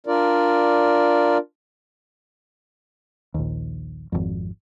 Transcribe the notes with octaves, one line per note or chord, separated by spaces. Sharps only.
D4 F4 A#4 D5
A#1 D#2
G#1 F2